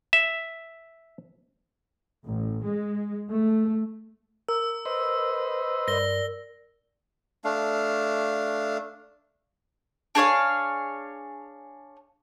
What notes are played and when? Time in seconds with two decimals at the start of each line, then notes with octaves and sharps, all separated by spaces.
0.13 E5
2.26 A1
2.64 G#3
3.30 A3
4.49 A#4 E6
4.85 B4 C5 D#5
5.88 G2 A#4 D5 A#6 G7
7.45 A3 D4 F5
10.15 D4 G#4 C#5 F5